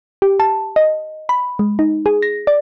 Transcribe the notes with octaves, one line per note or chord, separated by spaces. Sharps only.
G4
A5
D#5
B5
G#3
D#4
G#4
A#6
D5